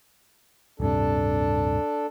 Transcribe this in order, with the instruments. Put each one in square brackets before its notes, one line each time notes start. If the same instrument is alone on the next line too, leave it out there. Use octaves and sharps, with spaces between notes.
[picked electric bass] D1 G2 C3 [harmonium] D4 A4